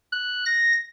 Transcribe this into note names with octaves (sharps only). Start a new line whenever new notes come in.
F#6
A#6